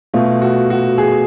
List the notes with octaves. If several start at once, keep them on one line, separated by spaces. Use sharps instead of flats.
B2 A3 F4
F#4
F#4
G#4